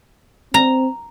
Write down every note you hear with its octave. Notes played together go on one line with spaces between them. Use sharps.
C4 A#5